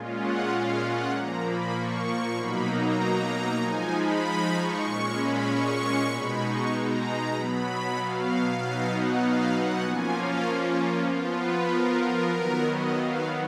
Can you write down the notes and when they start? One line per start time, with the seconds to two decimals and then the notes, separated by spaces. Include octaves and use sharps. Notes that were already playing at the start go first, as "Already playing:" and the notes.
Already playing: A#2 G#3 C#4 F4
0.17 F#5
0.48 F5
0.79 F#5
1.10 A#2 F3 A#3 A#5
1.42 B5
1.72 C#6
2.34 B2 F#3 A#3 D#4 B5
2.66 A#5
3.59 F3 G#3 D#4 G#5
3.91 B5
4.53 C#6
4.84 A#2 G#3 C#4
5.15 B5
5.46 C#6
6.08 B2 G#3 D#4 B5
6.39 C#6
6.70 A#5
7.33 B2 F#3 B3 B5
7.95 F5
8.57 B2 F#3 B3 D#4
8.89 F#5
9.20 F5
9.51 F#5
9.82 F3 A#3 C#4 F4 G#5
10.13 F5
11.06 F3 B3 F4
11.37 B4
11.68 A#4
12.00 A#4
12.31 D#3 F#3 B3
12.62 D#5
12.93 F5